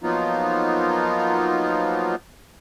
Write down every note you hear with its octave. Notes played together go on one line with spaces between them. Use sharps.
F3 F#3 A#3 B3 D#4 F4